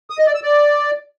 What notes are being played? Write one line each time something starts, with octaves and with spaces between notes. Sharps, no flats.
D#6
D#5
D5
E6
D5